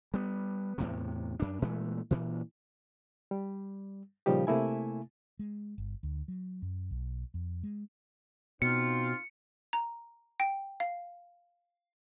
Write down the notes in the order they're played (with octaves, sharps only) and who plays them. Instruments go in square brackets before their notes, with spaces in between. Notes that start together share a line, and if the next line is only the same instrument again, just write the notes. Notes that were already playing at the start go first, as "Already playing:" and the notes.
[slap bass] G3 B3
E2 A2 C3
F#2 D4
A#2 E3 G#3 A3
A#2 E3
[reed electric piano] G3
A#2 C#3 F3 G3 D#4 G4
C3 A3 A#3 E4 G#5
[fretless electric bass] G#3
G1
D2
F#3
F#2
B1
F2
G#3
[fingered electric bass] B2 [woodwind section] C4 D#4 F4 [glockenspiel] C#7
[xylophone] A#5
G5
F5